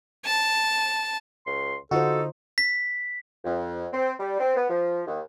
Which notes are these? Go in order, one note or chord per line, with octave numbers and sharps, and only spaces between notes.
A5
C#2 C6
D3 D#4 F4 F#4 A4 C5
B6
F2
C4
G3
C4
B3
F3
D#2